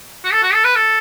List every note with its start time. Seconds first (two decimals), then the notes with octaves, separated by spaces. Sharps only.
0.25 F#4
0.32 A4
0.43 F#4
0.53 A4
0.64 B4
0.76 A4